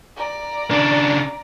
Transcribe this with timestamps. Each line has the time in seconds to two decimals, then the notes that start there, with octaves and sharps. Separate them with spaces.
0.16 D5 A#5
0.71 C#3 D4